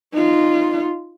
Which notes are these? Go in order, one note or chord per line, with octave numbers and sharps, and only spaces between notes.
D#4 F4